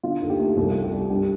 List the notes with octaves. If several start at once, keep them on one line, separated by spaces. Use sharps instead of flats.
D3 F4
D#2 A4
G4
A3
C2 A4
F4
G3
G4
G3
G2 G4